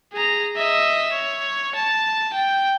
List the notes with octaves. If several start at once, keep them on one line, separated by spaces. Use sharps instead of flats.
G#4 A#5
D#5 E5
C#5
A5
G5